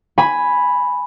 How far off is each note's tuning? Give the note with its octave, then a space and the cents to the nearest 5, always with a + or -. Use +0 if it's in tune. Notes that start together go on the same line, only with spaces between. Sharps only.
G#5 +0 B5 +0